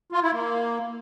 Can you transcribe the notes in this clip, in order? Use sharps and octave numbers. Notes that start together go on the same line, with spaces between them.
F4
E4
A#3